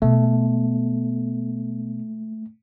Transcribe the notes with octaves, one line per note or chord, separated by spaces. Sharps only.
B2 A3